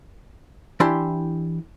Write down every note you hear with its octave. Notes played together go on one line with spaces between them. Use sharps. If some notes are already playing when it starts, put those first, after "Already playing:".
E3 D4 E4 G4 C6